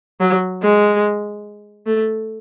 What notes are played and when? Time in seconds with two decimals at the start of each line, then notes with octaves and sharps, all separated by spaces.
0.20 F#3
0.62 G#3
1.86 A3